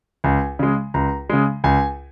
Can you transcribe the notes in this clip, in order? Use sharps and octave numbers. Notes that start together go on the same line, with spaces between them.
C#2 G#5
C#3 G#3
C#2 A#5
C#3 G#3
C#2 G#5